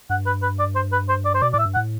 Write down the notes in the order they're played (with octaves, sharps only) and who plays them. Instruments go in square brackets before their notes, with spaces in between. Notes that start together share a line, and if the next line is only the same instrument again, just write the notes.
[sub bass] G2 [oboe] F#5
[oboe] B4
B4
D5
C5
B4
C5
D5
C5
[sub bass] B2 [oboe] D5
[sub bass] A2 [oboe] D5
[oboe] E5
[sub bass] G2
[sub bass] A2 [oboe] F#5